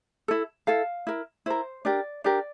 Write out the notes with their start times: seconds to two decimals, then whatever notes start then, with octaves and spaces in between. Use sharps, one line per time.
0.28 E4 A4
0.67 E4 A4 F5
1.07 E4 A#4
1.46 E4 A#4 C5
1.85 D4 G4 A#4 D5
2.24 D4 G4 A#4 D5